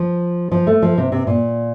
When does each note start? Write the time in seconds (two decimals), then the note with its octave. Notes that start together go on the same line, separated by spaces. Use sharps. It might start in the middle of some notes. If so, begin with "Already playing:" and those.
Already playing: F3
0.52 F3
0.67 A3
0.82 F3
0.98 C3
1.12 C3
1.27 A#2